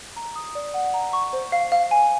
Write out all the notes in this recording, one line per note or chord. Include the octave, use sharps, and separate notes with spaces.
A#5
D#6
D5
F#5
A#5
C#6
C5
F5
F5
G#5